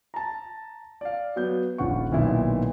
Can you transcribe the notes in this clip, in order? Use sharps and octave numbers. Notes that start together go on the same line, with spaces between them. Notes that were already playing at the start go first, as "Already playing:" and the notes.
A5 A#5
D5 F5
F#3 B3 G6
D#1 A#1 F4 F#5 C#6
B1 A#2 D#3 B3 E4